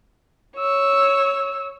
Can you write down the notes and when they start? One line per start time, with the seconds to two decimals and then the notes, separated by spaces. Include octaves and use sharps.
0.57 C#5 E6